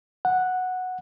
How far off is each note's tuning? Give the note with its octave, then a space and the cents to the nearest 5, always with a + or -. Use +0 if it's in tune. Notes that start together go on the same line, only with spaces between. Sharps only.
F#5 -5